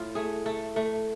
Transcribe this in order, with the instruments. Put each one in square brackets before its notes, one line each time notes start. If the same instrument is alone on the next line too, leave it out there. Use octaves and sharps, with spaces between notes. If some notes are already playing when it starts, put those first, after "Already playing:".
Already playing: [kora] A2 F4
A3 G#4
A3 A4
A3